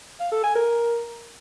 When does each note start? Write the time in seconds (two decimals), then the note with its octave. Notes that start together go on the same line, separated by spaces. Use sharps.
0.20 F5
0.32 A4
0.44 G#5
0.56 A#4